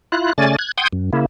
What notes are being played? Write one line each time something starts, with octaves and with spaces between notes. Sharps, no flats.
E4 F4 F#6
C#3 A3 C#4 D5 G#5 A6
F#6 G#6
F#5 G5 C6 D#6 G6 G#6
F#2
C#3 A#3 E4